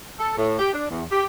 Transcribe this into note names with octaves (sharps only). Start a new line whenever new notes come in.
A4
A2
G4
D4
E2
G4